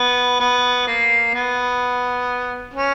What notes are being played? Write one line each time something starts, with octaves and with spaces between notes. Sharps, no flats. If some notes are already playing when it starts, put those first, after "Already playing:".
Already playing: B3
B3
A#3
B3
C#4